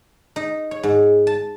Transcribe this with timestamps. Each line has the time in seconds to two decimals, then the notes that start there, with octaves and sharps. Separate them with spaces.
0.36 D#4
0.71 C#5
0.83 G#2
1.27 A5